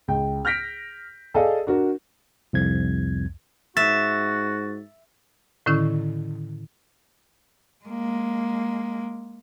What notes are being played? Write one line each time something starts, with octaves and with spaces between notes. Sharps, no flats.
C#2 G5
F6 G6 A#6 B6 D7
G#4 A4 D5 D#5 F5 G#5
D4 F#4 A#4
C2 F2 G#6
G#2 F#4 E5 A6
A2 D3 D#3 C#4 E4
G#3 A#3